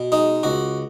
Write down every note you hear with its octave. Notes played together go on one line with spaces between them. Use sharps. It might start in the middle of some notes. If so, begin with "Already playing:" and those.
Already playing: B2
G#3 D#4
C#2 F#4